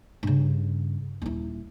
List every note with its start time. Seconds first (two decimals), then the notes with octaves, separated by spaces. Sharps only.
0.23 G2 C#3
1.22 D#1 E4